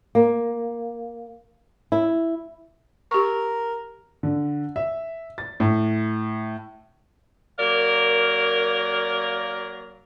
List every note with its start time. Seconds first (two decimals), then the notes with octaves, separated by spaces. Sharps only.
0.15 A#3
1.92 E4
3.11 G4 A#4 C#6
4.23 D3
4.76 E5
5.38 A6
5.60 A2
7.58 F#3 A#3 A#4 D5 F5